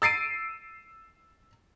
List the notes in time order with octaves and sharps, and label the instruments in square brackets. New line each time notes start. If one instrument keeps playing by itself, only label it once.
[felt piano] E6 A6 C7 D7 D#7